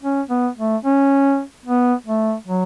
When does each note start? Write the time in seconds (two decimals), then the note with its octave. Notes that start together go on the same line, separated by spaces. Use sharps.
0.03 C#4
0.30 B3
0.58 A3
0.85 C#4
1.66 B3
2.07 A3
2.47 F#3